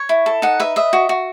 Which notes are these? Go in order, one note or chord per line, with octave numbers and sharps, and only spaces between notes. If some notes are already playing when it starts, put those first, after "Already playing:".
Already playing: C#5
E4
A4
D#4 F#5
B4 E5
D#5 E5
F#4
F#4